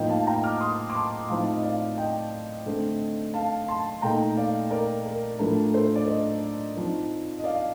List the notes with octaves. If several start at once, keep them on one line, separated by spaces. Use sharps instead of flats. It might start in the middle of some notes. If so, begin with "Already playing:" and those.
Already playing: A2 F3 A#3 D#4 D#5 G5
F5 A5
G5 A#5
D6 F6
C6 D#6
D6
A5 C6
A2 F3 C4 D#4 F5 A5
D#5
D5 F5
D#5 G5
D3 A3 C4
F5 A5
A5 C6
A#2 A3 D#4 G5 A#5
D5 F5
A#4 D5
A#4
A2 F3 A3 D4 A#4
A4 C5
D5
C5 D#5
F3 C4 D#4
D#5
D5 F5